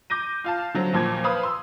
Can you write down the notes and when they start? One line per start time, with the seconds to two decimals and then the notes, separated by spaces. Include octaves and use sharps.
0.10 D6 G6 A#6 D#7
0.44 F4 F5 A5
0.74 D3 F#3 C4
0.93 D#2 A#2 F3 C6 G#6
1.24 B4 C5 F5 B5 D#6
1.43 C6 E6